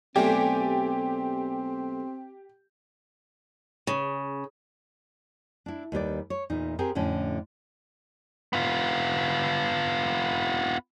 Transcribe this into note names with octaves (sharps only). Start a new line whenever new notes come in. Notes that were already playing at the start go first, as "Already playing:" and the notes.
B1 A3 C4 G4 D5 G#5
C#3
D4 E4
D#2 G3 B4 D5
C#5
E2 A#2 D#4
C4 G4 G#4 A#4
F2 A2 D3 C#4
B3 F4